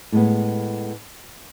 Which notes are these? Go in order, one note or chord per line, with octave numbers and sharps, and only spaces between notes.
A2 G#3 B3